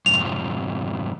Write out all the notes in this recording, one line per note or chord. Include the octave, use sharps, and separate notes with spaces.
F2 G#2 C3 F7